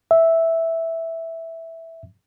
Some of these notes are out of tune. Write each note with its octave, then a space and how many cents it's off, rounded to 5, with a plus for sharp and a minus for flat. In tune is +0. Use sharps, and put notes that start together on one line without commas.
E5 -5